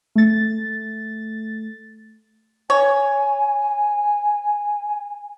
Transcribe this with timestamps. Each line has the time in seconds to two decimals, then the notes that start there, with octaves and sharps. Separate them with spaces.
0.15 A3 A6
2.70 C#5 G#5